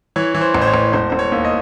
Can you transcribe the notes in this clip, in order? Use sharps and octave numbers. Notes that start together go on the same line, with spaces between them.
E3 C#5
E3
C5
A1
C5
C#5
A1
E1 C5
E1 C5
C#5
D#2
D#5